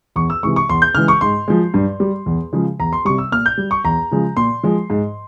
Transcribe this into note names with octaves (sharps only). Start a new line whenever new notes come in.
E2 C#6
E6
C3 E3 G#3 C#6
C#6
E2 C6
G6
C#3 E3 G#3 F6
C#6
G#2 C6
F3 G#3
G2
G3
E2
C#3 F3 G#3
E2 A#5
C6
C3 G3 C#6
E6
A#2 F6
G6
G3
C#6
E2 A#5
C#3 F3 G#3
A#2 C6
F3 G#3
G#2